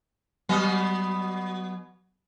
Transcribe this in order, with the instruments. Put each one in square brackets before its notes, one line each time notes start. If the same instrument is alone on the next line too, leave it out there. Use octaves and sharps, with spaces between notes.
[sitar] F#3 B3 D#5